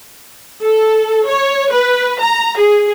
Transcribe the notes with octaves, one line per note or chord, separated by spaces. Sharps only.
A4
C#5
B4
A#5
G#4